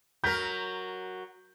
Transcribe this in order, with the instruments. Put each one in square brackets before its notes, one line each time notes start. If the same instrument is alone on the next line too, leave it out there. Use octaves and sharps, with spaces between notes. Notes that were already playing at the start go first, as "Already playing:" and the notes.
[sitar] F#3 A#4 [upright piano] G6 B6